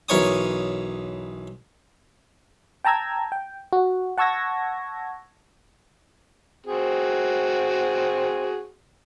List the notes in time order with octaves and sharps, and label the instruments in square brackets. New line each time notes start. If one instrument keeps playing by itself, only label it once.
[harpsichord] B1 E3 A#4 C#5 G#5 D#6
[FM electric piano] G5 A5 A#5 E6 G#6
G5
F#4
F#5 A5 C#6 E6 G#6 A#6
[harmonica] C4 F#4 G#4